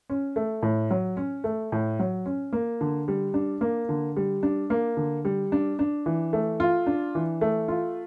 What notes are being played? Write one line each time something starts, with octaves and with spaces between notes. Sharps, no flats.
C#4
A3
A2
F#3
C#4
A3
A2
F#3
C#4
A#3
D3
G3
D4
A#3
D3
G3
D4
A#3
D3
G3
D4
D4
E3
A3
F4
D4
E3
A3
F4